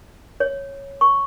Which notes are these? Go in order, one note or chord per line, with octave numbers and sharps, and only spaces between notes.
C#5
C#6